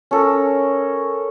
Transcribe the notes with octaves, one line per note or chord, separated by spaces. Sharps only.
C#4 A4 A#4